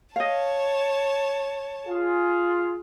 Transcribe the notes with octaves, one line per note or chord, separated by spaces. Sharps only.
C#5 D#5 F5 A5
F4 G#4